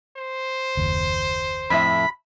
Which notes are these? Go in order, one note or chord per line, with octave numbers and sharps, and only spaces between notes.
C5
F#1 D#2
F2 A2 E5 B5